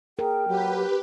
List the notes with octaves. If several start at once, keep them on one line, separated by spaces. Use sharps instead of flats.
G#4 A#4 G5
F#3 G4 B4